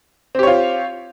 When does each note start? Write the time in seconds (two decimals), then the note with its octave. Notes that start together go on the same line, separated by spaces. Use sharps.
0.35 C4
0.39 G4
0.43 C#5
0.47 F4